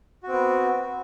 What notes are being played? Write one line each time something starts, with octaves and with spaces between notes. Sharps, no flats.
B3 C4 F#4